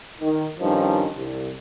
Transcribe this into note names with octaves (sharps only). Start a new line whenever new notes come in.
D#3
G2 D#3 F3 C#4 D#4
C2